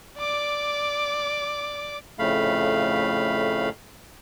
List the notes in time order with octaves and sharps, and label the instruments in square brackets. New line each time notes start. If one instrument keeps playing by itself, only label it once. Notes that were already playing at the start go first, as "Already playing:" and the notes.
[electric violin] D5 D6
[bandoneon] F2 A2 C#3 A3 F5 B5